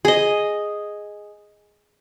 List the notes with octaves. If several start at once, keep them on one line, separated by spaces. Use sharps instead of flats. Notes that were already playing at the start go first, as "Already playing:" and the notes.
G#4 D#5